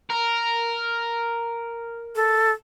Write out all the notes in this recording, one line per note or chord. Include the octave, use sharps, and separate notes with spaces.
A#4
A4